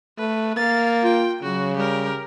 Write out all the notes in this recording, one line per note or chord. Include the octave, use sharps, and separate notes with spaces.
A3 B4
A#3 F5 A6
F4 G5
C#3 F#3 F#4
G3 G4 A#4